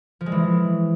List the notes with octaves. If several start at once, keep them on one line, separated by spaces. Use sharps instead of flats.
F3
G#3
E3